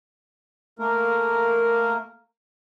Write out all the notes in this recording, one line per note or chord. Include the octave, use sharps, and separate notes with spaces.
A3 A#3 A#4